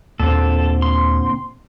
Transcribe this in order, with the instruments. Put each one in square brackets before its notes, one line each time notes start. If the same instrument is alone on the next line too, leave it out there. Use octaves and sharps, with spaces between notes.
[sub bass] D#2 [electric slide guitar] A#2 D3 C4 [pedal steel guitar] A4
[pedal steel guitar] C6